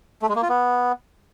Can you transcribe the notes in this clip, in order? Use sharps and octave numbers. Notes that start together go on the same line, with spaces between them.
A3
G#3
A#3
F4
B3